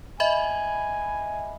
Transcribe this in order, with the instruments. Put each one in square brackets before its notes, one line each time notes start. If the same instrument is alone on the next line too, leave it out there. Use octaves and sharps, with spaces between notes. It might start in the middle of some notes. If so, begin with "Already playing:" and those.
[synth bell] D#5 E5 B5 [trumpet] G#5